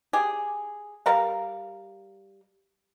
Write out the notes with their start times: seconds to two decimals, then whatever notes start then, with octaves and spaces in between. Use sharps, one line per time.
0.13 G4 G#4
1.06 G3 A#4 F5